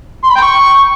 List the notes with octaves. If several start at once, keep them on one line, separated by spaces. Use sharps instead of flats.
C6
B5
G5
C#6